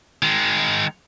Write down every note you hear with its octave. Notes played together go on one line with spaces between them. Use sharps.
D#3 G#3